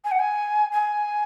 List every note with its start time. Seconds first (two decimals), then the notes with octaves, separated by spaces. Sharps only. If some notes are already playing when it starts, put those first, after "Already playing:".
0.05 G#5
0.11 F#5
0.19 G#5
0.72 G#5